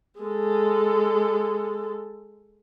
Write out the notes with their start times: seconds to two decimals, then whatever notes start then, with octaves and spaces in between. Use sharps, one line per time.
0.20 G#3 A4